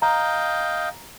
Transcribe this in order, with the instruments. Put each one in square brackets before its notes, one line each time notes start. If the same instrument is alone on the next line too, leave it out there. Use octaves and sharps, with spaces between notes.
[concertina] D#5 F5 G5 [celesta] A#5